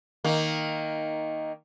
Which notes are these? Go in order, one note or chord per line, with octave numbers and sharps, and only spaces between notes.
D#3 A#3